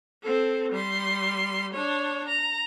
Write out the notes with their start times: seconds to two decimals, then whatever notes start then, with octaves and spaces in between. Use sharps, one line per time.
0.22 C4 A4
0.72 G3 C6
1.73 D4 C#5
2.29 A#5